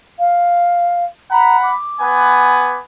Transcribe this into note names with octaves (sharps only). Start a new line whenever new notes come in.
F5
F#5 A#5 B5
D6
B3 B4 G#5